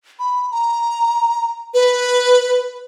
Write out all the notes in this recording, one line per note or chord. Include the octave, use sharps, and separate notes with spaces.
B5
A#5
B4